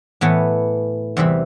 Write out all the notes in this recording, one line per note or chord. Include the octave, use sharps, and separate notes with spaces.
A2 E3 B3
E2 C3 E3 G3